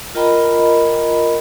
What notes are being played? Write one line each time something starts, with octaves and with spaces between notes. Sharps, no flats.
F4 A#4 D#5 G5 A#5 B5